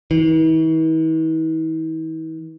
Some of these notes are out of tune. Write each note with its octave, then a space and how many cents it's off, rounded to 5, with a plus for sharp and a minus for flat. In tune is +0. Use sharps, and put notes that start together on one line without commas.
E3 -45